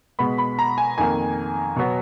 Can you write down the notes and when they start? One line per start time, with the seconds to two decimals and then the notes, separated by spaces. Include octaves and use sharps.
0.19 B2 G#3 B3 B5
0.38 B5
0.59 A#5
0.78 G#5
0.98 F2 D#3 A#3 G#5
1.76 B2 F#3 B3